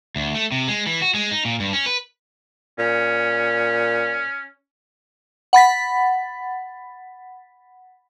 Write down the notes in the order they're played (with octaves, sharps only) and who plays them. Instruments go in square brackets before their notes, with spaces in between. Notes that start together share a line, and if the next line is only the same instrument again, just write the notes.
[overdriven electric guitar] D2
A3
C3
G#3
E3
F#4
G#3
D#4
A#2
G2
C#4
B4
[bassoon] A#2 [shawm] C#4
[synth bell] F#5 B5 A6 B6